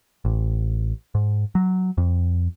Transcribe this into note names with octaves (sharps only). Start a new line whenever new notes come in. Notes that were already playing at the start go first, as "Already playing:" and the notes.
A1
G#2
F#3
F2